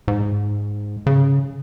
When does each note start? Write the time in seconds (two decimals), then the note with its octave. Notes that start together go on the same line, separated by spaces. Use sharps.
0.08 G#2
1.06 C#3